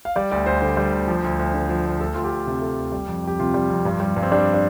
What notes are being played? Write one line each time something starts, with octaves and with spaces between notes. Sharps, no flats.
F5
G3 D5
D2 D5
D2 C5
D3 C5
G3
D2
F3
D2
D2
D3
F3
D2
A3 A4
D2 F4
G4
D2
C3
A3
D2
G3
F2
F2 G4
C3 F4
G3
F2
G2
G3
G2
C4
G3 D4
D4